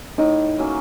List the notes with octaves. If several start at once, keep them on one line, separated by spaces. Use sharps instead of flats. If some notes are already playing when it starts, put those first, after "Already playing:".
A2 D#4
F#3 A#3 C#4